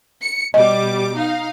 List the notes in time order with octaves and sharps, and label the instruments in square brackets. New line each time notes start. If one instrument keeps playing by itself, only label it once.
[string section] C#7
[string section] B2 G3 D6 [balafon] D#5
[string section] D#4 F5